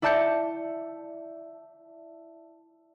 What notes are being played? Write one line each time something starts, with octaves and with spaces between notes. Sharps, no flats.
E4 D5 E5 A5 G6 C#7